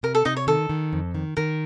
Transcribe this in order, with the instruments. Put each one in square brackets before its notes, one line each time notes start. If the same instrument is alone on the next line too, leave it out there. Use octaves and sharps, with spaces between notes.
[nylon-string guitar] C3 [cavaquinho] A#4
[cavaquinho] A4
[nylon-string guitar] C3 [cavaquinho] D#4 D#5
[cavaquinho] C#5
[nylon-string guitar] D#3 [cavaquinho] A4
[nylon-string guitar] D#3
F2
D#3
[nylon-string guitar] D#3 [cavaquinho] A#4